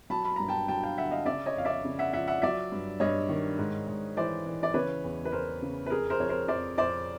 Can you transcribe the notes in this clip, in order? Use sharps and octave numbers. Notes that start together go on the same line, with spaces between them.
F#3 A5 B5
B5
G2 A#5
G5 A5
F#3 G5 A5
F5 G5
D3 E5 F#5
D#5 F5
C#3 D5 E5
C#5 D#5
F2 F5
D5 E5
C#3
E5 F#5
F3 E5 F#5
E5 F#5
F#3 D5 E5
G2
G2 C#5 D#5
D#3
G#2
G#2
E3 C5 D5
E3
D5
C#3 B4 C#5
E2
B4
E2 A#4 C5
C#3
B4
F2 G#4 A#4
A#4 C5
F2 C#5
A#4 C5
F2 C5 D5
F2 C5 D5